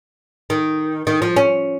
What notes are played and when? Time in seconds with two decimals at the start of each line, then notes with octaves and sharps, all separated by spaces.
0.50 D#3
1.07 D#3
1.22 F3
1.36 C#4